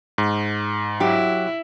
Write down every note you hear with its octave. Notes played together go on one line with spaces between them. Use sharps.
G#2
F#3 E4 G4